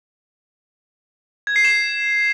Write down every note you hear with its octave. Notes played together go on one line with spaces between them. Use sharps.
G#6
C7
E7